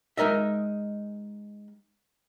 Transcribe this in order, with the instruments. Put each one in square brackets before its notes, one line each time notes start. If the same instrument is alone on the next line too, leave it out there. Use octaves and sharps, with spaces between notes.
[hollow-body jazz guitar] G#3 D#4 A#4 D#5 E5